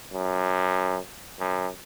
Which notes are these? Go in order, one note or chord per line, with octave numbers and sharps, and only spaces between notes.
F#2
F#2